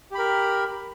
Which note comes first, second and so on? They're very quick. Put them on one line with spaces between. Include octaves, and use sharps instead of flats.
G4 B5 A#4